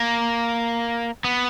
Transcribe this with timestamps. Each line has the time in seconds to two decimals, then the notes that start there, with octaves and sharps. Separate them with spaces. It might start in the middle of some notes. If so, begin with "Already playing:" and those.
Already playing: A#3
1.24 B3